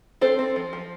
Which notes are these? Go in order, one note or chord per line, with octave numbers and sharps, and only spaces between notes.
C4 A4 C5
C4
F3
F3